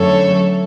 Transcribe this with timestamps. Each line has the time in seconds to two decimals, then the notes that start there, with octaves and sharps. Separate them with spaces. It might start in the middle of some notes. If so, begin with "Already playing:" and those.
Already playing: F#2 D3 F#3 A3 A4 C#5